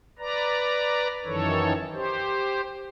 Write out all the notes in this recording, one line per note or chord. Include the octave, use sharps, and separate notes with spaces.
B4 D5 A#5
F#2 D#3 E3 A4 C#5
G4 C5